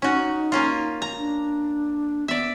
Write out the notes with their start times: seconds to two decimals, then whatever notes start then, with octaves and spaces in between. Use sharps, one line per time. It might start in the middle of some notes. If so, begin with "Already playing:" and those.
0.02 C#4 D#4 F#4
0.52 A#3 C#4 F4
1.02 A#5
1.18 D4
2.28 B3 D5 E5